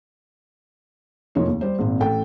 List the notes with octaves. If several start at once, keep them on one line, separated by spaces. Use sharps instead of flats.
F1 F3 A#3 D#4 C#5
D#2
G3 C5
G#1 A#2 C4
A1 A4 G5